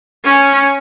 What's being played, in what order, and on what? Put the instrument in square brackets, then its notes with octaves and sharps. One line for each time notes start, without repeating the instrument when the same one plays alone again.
[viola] C#4